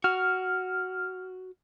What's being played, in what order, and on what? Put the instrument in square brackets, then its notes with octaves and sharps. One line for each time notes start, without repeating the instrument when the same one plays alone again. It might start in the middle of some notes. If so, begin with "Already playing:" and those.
[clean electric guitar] F#4 [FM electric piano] F6